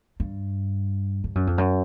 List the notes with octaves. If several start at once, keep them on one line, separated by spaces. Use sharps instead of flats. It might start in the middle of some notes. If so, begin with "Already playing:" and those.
G2
G2
F#2
F2
F#2